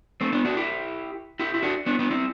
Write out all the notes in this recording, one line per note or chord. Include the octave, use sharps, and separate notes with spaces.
A3 C4
B3 D4
D4 F#4
E4 G4
E4 G4
E4
D4 F#4
B3 D4
B3 D4
C4 E4